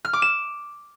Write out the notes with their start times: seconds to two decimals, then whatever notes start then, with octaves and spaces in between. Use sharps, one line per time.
0.05 F6
0.13 D6
0.22 E7